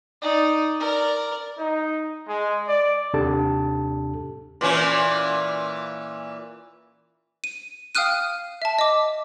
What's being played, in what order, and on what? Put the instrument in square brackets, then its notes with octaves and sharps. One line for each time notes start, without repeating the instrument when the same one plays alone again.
[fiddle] D#4 D5
A#4 D5
[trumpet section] D#4
G#3
D5
[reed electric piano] D#2 C3 D4 G4 A4 A5
[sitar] A#2 E3 C#4
[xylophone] D#7
F5 G5 D#6 F6 F#6 D#7
E5 A5
D#5 D6